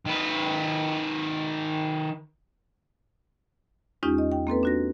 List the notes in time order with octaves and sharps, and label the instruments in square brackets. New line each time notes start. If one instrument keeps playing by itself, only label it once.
[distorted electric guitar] D#3 B4
[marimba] E2 G#3 C#4 D#4 F4 G4
D#5
G5
A#3 C4 A4 B4
D4 F#4 A#6